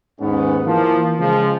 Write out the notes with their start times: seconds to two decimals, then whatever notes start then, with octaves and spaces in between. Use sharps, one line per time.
0.20 D#2 G#2 B3 C#4
0.65 E3 F3 A#3
1.19 C#3 F3 G#3